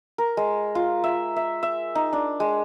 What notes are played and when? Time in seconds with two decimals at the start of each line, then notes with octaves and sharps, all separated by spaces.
0.18 A#4
0.37 G#3
0.75 F4
1.04 E5
1.36 E5
1.63 E5
1.95 D#4
2.13 D4
2.40 G#3